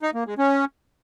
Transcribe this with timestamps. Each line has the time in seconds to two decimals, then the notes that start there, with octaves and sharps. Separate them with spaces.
0.03 D#4
0.14 A#3
0.26 G#3
0.38 C#4